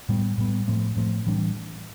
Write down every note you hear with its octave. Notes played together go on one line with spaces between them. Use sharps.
A2 G3 B3
A2 G3 B3
A2 F3 A3 C4
A2 F3 A3 C4
A2 E3 G3 D4